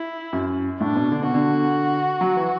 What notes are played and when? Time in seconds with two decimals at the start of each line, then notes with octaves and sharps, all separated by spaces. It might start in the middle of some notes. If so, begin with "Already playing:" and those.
Already playing: E4
0.33 F#2
0.79 A2 D4
0.96 B2
1.11 D3
1.22 B2 F#4
1.34 D3
2.21 F#3
2.37 E3